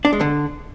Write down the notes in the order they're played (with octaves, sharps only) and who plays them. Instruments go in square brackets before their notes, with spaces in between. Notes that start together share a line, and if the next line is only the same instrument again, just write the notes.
[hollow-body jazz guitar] D4
G#3
D3